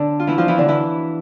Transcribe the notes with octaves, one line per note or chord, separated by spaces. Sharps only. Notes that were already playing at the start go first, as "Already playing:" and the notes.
Already playing: D3 D4
F4
E3 E4
F3 F4
E3 E4
D3 D4
E3 E4